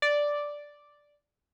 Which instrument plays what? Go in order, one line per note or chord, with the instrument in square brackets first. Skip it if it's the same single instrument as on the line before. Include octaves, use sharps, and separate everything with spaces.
[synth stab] D5